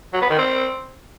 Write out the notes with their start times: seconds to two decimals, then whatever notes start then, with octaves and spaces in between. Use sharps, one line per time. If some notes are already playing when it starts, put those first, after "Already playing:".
0.13 F#3
0.22 B3
0.30 D#3
0.38 C4